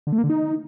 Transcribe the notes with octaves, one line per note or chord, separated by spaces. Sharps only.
D3
A3
A#3
D3
D#4